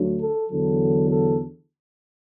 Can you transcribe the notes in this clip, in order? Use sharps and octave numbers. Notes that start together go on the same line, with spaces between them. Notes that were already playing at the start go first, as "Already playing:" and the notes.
Already playing: D2 D3 F#3 A3
A4
E2 D3 F#3 A4
A4